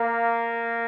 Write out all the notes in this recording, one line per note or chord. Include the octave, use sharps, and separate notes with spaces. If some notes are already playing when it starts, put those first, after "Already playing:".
Already playing: A#3